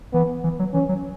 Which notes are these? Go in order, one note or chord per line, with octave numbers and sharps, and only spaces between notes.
E3 B3
E3
F#3
E3 C#4
F#3